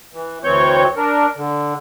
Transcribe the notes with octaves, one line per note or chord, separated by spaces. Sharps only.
E3
D2 E3 C4 C#5 C#6 G6
D4 A#4
D3